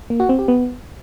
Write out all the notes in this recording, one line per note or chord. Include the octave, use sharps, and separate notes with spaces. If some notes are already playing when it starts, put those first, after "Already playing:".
A#3
F#4
C4
G4
B3